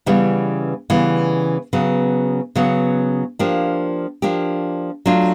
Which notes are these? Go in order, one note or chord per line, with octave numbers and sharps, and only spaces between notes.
C#3 E3 G3 B3
C#3 E3 G3 B3
C#3 F#3 B3
C#3 F#3 B3
F3 A#3 D4 G4
F3 A#3 D4 G4
F#3 A3 D4 F4